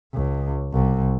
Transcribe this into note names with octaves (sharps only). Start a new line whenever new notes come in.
C#2
C2